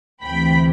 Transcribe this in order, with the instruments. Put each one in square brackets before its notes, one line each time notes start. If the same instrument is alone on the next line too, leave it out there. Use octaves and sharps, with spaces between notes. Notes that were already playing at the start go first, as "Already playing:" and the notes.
[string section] D2 C3 E3 G5 B5